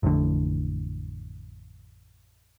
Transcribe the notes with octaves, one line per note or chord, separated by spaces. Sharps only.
A1 F2 A2 D3